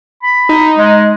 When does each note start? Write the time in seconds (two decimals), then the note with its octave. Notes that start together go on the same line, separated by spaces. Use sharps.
0.23 B5
0.49 D#4
0.77 G#3